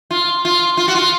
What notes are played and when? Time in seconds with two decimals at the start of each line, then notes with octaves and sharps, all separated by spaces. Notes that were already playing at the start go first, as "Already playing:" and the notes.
0.11 F4
0.45 F4
0.77 F4
0.88 F#4
0.95 F4